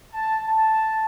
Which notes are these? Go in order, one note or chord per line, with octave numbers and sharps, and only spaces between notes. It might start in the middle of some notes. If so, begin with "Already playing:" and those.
A5
A5